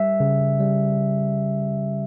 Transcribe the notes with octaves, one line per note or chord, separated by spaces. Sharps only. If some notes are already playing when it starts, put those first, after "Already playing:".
Already playing: G3 E5
C#3
G3